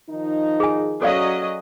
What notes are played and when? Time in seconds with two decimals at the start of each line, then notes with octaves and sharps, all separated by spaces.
0.10 D#3 F3 D#4
0.60 G#4 G#5
1.02 F#3 C#4 A4 D5 D#5 F5